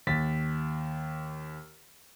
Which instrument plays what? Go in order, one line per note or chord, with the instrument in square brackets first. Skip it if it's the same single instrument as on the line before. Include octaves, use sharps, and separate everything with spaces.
[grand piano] D#2 A6 B6